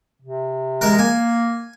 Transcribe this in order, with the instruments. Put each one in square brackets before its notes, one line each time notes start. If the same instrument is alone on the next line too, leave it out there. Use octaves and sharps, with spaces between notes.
[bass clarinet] C3
[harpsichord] G#3 A#4
[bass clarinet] A#3 [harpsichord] G#5